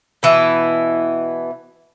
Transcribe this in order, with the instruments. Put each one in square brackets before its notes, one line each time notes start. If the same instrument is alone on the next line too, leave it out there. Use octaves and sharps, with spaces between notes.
[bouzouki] B2 E3 B3